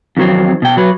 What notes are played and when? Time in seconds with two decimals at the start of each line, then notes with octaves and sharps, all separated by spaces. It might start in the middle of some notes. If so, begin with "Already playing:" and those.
0.17 F2 D#3 F#3 C4
0.62 B2 G5
0.77 F#3 B4